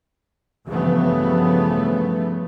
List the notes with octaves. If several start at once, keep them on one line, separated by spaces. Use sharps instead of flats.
G2 C#3 E3 F3 A3 B3